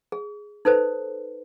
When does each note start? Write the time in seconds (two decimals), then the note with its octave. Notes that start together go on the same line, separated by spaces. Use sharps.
0.12 G#4
0.65 D#4 A4 B4 C5